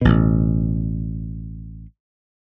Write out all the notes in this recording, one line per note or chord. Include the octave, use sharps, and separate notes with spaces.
A1 B2